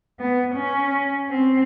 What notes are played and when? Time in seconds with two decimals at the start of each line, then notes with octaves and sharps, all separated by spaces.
0.20 B3
0.55 C#4
1.29 C4